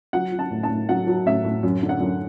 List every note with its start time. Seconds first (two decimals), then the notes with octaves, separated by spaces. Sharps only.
0.13 F#3 F#5
0.32 F#3
0.39 A5
0.51 A2
0.63 A5
0.70 A2
0.89 F#3 F#5
1.07 F#3
1.26 A2 E5
1.44 A2
1.63 F#2
1.83 D3
1.89 F#5
2.00 F#2